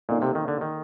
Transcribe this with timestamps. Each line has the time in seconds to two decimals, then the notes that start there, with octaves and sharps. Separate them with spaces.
0.09 A#2 A#3 D#4 A4 D#5
0.22 C3
0.35 D#3
0.48 D3
0.61 D#3